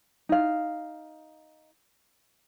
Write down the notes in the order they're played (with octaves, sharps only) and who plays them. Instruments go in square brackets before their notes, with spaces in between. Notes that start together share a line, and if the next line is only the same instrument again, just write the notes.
[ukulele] D#4 F5